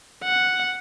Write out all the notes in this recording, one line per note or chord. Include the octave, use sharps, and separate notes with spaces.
F#5